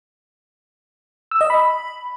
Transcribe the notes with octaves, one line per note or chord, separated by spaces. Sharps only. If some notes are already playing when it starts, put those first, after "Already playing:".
E6
D#5
B5